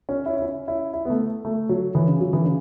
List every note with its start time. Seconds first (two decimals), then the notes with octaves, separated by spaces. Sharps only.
0.09 C#4
0.26 E4
0.37 E4
0.42 C#4
0.68 E4
0.93 E4
1.05 B3
1.10 A3
1.45 A3
1.69 F#3
1.95 E3
2.08 C#3
2.21 F#3
2.33 E3
2.45 C#3